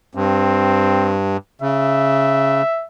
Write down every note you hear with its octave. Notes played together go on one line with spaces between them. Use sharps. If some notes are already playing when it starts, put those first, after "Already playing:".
G2 C4
C#3 E5